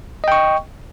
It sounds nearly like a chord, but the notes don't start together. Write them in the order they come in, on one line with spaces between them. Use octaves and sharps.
D#5 G5 C#6